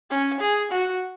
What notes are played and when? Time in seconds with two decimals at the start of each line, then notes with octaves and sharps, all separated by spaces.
0.10 C#4
0.40 G#4
0.71 F#4